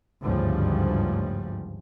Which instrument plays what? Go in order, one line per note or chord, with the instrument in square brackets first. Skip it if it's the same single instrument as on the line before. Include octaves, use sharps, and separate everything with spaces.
[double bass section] G#1 D2 G2 C#3 F3 G3